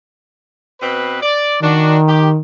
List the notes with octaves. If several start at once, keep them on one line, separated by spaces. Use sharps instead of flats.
B2 C4 B4
D5
D#3 D4 F#4
G4